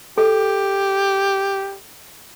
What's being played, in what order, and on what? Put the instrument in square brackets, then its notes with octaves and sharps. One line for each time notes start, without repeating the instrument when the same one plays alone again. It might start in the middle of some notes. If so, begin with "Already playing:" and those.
[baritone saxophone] G4 [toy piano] A4